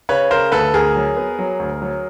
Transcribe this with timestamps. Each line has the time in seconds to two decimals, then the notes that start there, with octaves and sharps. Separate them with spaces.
0.09 C#3 B4 C#5
0.31 C#3 A#4 C5
0.52 D2 A4 B4
0.74 D2 G#4 A#4
0.96 F#3
1.17 B3
1.39 F#3
1.60 D2
1.82 F#3